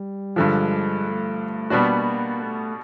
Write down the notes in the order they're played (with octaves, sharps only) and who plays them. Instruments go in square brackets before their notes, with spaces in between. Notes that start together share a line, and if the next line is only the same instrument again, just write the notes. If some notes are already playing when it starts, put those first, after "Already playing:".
Already playing: [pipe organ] G3
[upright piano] G2 D3 F3 [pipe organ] G#3
[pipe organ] A3
[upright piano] B2 G3 B3 D4 F#4 [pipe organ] A#3
[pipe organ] A3